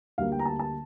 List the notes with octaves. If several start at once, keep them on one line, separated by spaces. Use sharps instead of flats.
D2 D3 G3 A#3 F5
G5
A#5
A5
A5